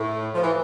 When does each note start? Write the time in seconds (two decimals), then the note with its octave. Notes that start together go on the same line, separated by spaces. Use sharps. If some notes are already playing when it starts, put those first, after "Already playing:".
Already playing: A2
0.34 F3
0.43 E3